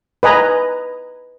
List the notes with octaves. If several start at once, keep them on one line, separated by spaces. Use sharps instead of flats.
B4 D#5 G#5 A#5